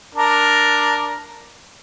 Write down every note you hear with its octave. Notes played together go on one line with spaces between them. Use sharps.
D4 A#4